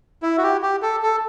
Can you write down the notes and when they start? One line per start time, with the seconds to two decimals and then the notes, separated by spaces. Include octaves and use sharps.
0.23 E4
0.38 F#4
0.43 G4
0.63 G4
0.82 A4
1.03 A4